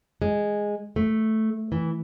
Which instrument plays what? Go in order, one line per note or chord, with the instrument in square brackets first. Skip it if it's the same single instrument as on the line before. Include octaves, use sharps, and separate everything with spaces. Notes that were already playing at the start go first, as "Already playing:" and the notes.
[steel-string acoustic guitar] G#3
A3
E3